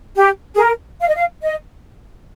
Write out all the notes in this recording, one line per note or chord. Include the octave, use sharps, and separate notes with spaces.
G4
G#4
A#4
F5
D#5
F5
D#5